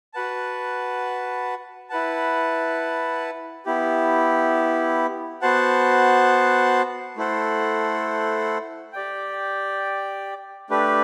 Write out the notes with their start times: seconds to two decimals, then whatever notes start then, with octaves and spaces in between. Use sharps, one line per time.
0.14 F#4 B4 F#5 A5
1.89 E4 B4 F#5 A5
3.66 B3 E4 G4
5.42 B3 F#4 C5 F#5 A5
7.17 A3 E4 A4 C5 F#5
8.93 G4 D5 G5
10.70 A3 D4 G4 B4